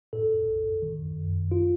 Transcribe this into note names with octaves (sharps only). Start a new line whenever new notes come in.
A2 A4
B1
D#3
F#2
F4